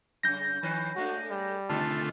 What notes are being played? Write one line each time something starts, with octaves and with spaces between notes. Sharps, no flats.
F#2 C#3 G6 A#6
D#3 B4 C#5
G#3 A3 D4 F#4
G3
B2 D3 D#3 A3 F4 A5